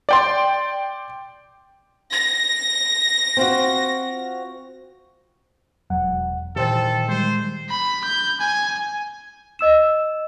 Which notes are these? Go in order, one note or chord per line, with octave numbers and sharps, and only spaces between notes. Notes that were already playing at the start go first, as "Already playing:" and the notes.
D5 G5 C6
A#6
C4 F4 F#4
E1 F#3 F#5
A#2 D#3 E3 G4 A4 C5 G5
G3 G#3 C5
B5
G6
G#5
D#5 E6 E7